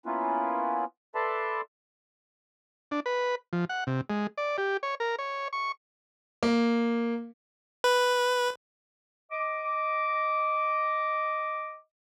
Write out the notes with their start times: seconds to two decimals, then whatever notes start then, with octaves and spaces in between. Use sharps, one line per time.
0.06 A#3 B3 C#4 E4 F4 B4
1.15 A4 B4 D5 E5 A5 C6
2.91 D4
3.06 B4
3.53 F3
3.69 F#5
3.87 C3
4.10 G#3
4.38 D5
4.58 G4
4.83 C#5
5.00 A#4
5.19 C#5
5.53 C#6
6.43 A#3
7.84 B4
9.32 D#5 D6